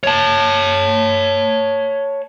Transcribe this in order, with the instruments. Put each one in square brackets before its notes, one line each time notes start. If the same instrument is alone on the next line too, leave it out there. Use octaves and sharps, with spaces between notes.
[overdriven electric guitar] C#5 A5